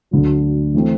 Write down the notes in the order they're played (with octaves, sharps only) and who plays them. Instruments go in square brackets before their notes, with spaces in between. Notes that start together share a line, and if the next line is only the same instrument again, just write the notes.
[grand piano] D2 D3 F#3
E3 A3 C4